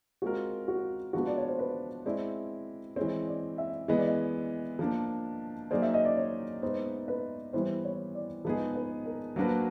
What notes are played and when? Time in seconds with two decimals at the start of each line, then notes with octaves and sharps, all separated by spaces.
0.22 G#3 C4 F4 F#4 A#4
0.68 F#4
1.13 F3 G#3 B3 D4 F4 F#4
1.27 D5
1.38 C#5
1.49 C5
1.59 B4
2.06 G#3 C4 E4 D5
2.96 E3 G#3 C4 C#5
3.28 D5
3.58 E5
3.88 E3 G#3 B3 D#5
3.98 D5
4.07 D#5
4.79 F3 A#3 D4
5.71 F#3 A#3 D#4 G#4 C5 D5
5.82 E5
5.94 D#5
6.05 D5
6.17 C#5
6.62 G#3 B3 D#4 C5
7.08 B4
7.53 E3 G3 B3 E4 C5
7.85 C#5
8.15 D5
8.45 F3 G#3 B3 D#4 G#4
8.75 B4
9.06 A#4
9.36 F#3 A#3 D4 F#4 B4 C5